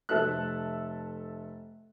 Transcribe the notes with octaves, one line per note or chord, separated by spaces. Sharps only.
F1 A4 E5 F#6